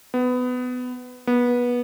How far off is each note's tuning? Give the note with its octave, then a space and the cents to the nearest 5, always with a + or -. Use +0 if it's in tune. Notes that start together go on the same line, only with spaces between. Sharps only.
B3 +20
B3 -20